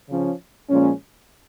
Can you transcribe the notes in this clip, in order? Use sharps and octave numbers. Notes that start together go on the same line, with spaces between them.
C#3 F3 C#4
A#2 F3 G#3 C#4